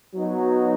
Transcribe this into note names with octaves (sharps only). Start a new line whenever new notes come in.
F#3 B3 D#4